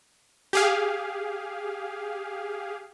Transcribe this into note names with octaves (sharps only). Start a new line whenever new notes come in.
G4 G#4 F5